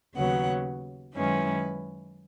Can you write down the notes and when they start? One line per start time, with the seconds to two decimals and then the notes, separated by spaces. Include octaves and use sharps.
0.15 D#2 C#3 F#3 B3 F#5
1.14 F#2 D#3 G#3 C#4 E4 B4